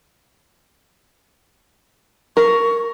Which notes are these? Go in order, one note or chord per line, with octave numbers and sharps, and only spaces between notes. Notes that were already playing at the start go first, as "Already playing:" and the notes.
A#4 C#6